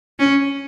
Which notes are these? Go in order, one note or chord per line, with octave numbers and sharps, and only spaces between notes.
C#4